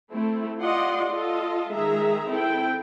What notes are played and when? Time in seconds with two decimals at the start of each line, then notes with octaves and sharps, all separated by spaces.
0.12 A3 C4 E4
0.60 F4 G4 D5 D#5 F#5 C6
1.10 F4 A4 D#5
1.72 D#3 G#3 G#4 E5 A#5
2.28 C4 E4 A4 G5